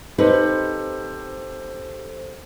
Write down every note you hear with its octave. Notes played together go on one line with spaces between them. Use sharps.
C4 D#4 G4 A4 B4 C5